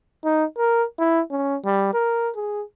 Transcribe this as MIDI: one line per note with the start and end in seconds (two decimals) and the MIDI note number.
0.24 0.45 63
0.58 0.84 70
0.99 1.21 64
1.31 1.56 61
1.65 1.89 55
1.94 2.30 70
2.36 2.62 68